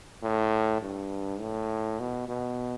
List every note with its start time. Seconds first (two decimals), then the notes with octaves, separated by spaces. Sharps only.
0.22 A2
0.82 G2
1.40 A2
2.00 B2
2.29 B2